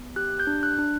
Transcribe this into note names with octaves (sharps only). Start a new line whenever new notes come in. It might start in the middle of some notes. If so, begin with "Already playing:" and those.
Already playing: B3
G4 F#6
G6
D4
F#6
D4